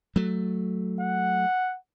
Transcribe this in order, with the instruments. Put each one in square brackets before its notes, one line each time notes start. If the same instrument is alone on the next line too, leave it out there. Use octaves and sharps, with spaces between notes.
[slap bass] F#3 A3
[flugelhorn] F#5